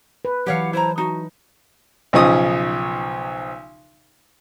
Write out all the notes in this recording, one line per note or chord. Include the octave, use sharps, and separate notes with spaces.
B4
E3 F#3 G4 C#5 F5 F#5
E4 C5 A#5
D#4 F#4
B1 C#3 F3 D#4 C#6 D#6